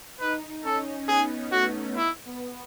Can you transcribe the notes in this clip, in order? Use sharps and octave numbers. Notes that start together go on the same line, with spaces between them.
D#4 B4
C#4 A4
B3 G#4
A3 F#4
E4
B3